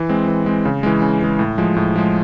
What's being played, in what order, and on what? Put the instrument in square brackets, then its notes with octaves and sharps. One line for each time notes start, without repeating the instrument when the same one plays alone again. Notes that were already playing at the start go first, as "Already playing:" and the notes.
Already playing: [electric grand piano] E3
G#3 C4
E3
G#3 C4
C#3
E3 G#3
C#3
E3 G#3
A2
F3 G#3
A2
F3 G#3